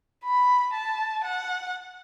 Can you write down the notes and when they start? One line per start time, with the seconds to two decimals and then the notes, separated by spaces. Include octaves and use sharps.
0.24 B5
0.74 A5
1.24 F#5